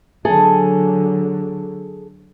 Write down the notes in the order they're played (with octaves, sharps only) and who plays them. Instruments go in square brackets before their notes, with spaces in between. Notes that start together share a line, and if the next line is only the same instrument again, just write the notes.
[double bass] D3 F#3 [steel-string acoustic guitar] G#4 A4 G#5